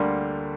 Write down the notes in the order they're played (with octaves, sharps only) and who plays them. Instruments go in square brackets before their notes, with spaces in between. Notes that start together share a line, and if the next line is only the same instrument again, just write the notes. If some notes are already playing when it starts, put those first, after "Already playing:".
Already playing: [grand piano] D2 D3 G3 A#3 C6